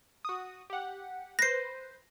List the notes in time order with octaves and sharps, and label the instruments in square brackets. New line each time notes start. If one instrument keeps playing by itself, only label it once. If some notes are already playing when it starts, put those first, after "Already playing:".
[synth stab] F#4 D#6
G4 F#5
[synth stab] B4 C5 [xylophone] A#6 C7